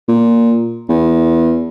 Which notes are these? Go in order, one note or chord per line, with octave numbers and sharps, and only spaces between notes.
A#2
E2